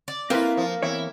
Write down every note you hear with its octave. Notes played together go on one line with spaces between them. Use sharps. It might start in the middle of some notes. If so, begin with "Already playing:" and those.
D5
A#3 C4 E4 F4 B4
F3
E2 C4 E4 C#5